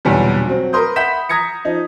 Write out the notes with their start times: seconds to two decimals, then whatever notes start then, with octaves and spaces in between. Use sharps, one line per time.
0.05 B1 E2 A#2 D3 G3
0.46 F#3 C4
0.73 A#4 B4 C6 D#6 G6
0.96 E5 F#5 B5 G6 B6 E7
1.29 A#5 D#6 G#6 A#6 C#7
1.65 F3 D#4